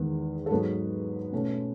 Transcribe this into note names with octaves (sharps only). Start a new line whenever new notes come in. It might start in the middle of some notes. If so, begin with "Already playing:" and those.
Already playing: E2 D#3 G#3 B4
A4
G#2 F#3 B3 D#4 B4
B2 A3 C#4